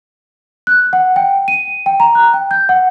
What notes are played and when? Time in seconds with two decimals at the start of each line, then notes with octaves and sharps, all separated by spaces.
0.67 F#6
0.93 F#5
1.16 G5
1.48 D#7
1.86 G5
2.00 A#5
2.15 F#6
2.34 G5
2.51 G6
2.69 F#5